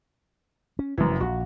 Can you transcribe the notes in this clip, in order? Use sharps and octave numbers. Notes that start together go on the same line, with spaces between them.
C#4
F1 F#2 E3
A#1 F#4